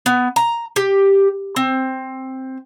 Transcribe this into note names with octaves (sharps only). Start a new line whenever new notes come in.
B3
A#5
G4
C4